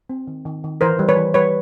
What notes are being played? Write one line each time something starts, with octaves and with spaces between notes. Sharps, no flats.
C4
D#3
D#3
D#3
E3 A#4 C5
G3
B4 C#5
E3
G3 B4 C#5